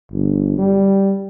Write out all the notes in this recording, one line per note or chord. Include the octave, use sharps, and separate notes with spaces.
G1
G3